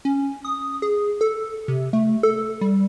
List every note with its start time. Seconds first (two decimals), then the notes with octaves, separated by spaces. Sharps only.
0.05 C#4
0.45 D#6
0.82 G#4
1.21 A4
1.68 C3
1.93 A3
2.23 A4
2.61 G3